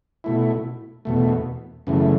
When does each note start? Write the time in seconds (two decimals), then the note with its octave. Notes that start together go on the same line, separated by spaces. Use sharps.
0.24 B2 A3 E4
1.05 E2 B2 A3
1.87 F#2 C#3 E3 A3